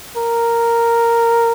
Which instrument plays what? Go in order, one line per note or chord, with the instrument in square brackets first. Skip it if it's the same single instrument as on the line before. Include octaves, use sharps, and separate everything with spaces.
[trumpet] A#4